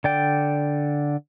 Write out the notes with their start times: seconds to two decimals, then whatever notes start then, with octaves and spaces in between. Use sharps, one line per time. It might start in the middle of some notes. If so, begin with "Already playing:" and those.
0.04 D3 D5 G5